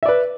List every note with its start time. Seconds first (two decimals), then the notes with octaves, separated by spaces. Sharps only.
0.03 E5
0.06 D5
0.09 B4